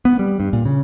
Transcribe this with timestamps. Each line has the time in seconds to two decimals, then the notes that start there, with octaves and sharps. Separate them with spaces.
0.05 B3
0.19 G3
0.40 G2
0.53 A#2
0.65 C#3